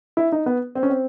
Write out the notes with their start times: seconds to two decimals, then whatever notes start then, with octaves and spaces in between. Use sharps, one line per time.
0.17 E4
0.32 D#4
0.46 B3
0.75 C4
0.83 C#4
0.90 C4